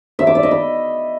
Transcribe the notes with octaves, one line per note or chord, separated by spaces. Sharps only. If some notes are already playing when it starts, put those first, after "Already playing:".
E5
D6
D5
D#5
B5